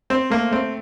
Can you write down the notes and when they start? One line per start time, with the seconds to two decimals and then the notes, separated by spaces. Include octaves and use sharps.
0.10 C4 C5
0.30 A3 A#3
0.51 A3 C4